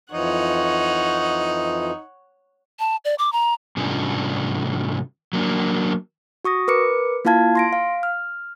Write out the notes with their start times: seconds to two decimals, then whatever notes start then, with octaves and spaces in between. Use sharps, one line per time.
0.12 F2 E3 F3 D#4 C#5 F#5
2.79 A5
3.05 D5
3.18 D6
3.33 A#5
3.77 G#2 C3 G3 C#4 D4 F4
5.33 F#3 A#3 D4
6.45 F#4 C#6 D#6 A#6
6.68 A#4 B4 D6 C#7
7.25 A#3 E4 F4 F5 A5 G#6
7.55 C6 A#6 D7
7.73 F5
8.03 F6